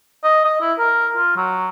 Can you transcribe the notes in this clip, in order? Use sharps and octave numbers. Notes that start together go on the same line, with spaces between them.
D#5
D#5
E4
A#4
F4
F#3